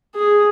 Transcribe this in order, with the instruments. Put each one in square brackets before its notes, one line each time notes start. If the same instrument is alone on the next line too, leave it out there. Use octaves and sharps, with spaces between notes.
[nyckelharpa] G#4